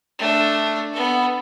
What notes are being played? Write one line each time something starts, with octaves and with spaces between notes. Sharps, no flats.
A3 D4
B3 A4